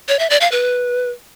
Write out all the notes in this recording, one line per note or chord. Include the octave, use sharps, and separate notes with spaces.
C#5
E5
D5
F5
B4